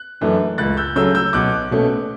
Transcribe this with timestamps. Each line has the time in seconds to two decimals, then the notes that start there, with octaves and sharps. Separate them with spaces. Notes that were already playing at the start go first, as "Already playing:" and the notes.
Already playing: F#6
0.21 F#2 E3 A3 D4
0.58 C#2 F#6 A6
0.77 E6 G6
0.96 C#3 F#3 A3 C#4 E6 G6
1.15 E6 G6
1.33 B1 D6 F#6
1.71 B2 A3 C#4